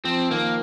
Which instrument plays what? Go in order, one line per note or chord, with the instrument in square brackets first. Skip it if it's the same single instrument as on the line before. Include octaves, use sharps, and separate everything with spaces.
[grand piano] F3 [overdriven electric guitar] C4
[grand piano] D#3 [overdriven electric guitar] A#3